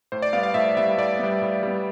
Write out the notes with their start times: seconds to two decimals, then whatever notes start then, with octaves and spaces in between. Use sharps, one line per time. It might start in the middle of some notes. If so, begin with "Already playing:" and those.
0.12 A2 C5
0.22 D5
0.33 G3 B3 F5
0.43 F5
0.54 A2 E5
0.77 G3 B3 E5
0.98 A2 D5
1.19 G3 B3
1.42 A2
1.63 G3 B3